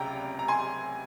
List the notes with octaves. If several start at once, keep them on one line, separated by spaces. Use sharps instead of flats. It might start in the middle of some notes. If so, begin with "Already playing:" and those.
Already playing: C#2 C3 G5 A#5
A#5
G#5 C6